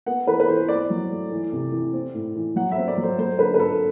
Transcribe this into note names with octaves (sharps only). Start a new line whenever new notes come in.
B3 F#5
E3 B4
B4
E3 C5
C4 D5
F#3
A3
E3
C3
E3
C4
A2
E3
F#3 F#5
E5
C4
D5
F#3
C5
F#3 C5
D3 B4
B4
C4 A4